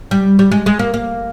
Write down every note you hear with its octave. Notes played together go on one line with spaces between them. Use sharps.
G3
G3
G#3
G#3
A#3
A#3